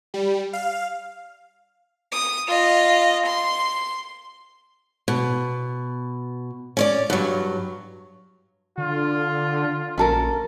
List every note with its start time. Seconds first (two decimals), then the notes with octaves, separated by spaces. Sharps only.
0.14 G3
0.53 F5
2.12 D#6
2.48 F4 D#5
3.27 C6
5.08 B2
6.77 C#4 C#5 D5
7.10 G2 F#3
8.78 D3 F4
9.98 A#1 C#4 A4 A#4